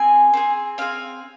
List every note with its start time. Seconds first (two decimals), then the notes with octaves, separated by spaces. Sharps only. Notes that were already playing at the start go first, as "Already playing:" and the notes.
Already playing: C4 G#4 G#5
0.34 C4 G#4
0.78 C4 G#4 F5